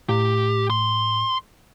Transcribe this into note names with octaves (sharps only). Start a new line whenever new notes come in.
A2 G4
C6